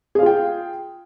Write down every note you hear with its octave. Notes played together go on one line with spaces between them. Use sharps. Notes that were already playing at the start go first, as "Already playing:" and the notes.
F4 G#4 F5 G5